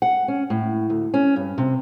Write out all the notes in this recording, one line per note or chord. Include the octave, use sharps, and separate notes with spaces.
F#5
C#4
A2
D2
C#4
G2
C3